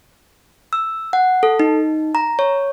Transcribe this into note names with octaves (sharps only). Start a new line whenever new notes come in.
E6
F#5
A4
D#4
A#5
C#5